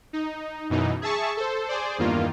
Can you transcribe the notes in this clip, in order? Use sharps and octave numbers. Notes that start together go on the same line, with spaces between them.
D#4
F#2 B2 E3 D#4
G#4 E5 A5 C#6
A4 C5
G#4 C5 D5
E2 G2 D#3 A#3 F4